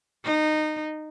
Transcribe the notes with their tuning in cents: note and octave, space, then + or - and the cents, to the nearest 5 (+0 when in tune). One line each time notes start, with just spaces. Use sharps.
D#4 -20